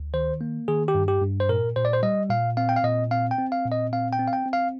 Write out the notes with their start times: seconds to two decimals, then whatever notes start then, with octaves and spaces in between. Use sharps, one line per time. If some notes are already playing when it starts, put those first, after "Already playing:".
Already playing: D2
0.14 D#3 C5
0.41 A#3
0.68 D#3 G#4
0.88 G4
0.95 G2
1.08 G4
1.22 G2
1.40 C5
1.49 A#2 A#4
1.76 A#2 C5
1.85 D5
1.93 C5
2.03 G3 D#5
2.30 A#2 F5
2.57 C4 F5
2.69 G5
2.76 F5
2.84 A#2 D#5
3.11 C4 F5
3.31 G5
3.38 C4
3.52 F5
3.65 A#2
3.72 D#5
3.92 C4 F5
4.13 G5
4.19 C4
4.28 F5
4.33 G5
4.46 C4
4.53 F5